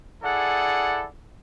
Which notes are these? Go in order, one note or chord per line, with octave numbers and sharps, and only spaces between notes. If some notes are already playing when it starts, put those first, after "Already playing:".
E4 G#4 A4 D5 F#5